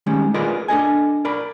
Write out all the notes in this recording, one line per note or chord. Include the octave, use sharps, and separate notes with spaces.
D#3 G3 G#3 C#4
F4 G#4 A#4 B4 D5 D#5
D4 A4 D#5 G#5
A#4 D5 B5